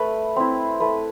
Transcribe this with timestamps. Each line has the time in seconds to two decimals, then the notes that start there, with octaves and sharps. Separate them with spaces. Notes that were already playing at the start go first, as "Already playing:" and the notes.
Already playing: A3 B4
0.36 C4 E4
0.80 A3 B4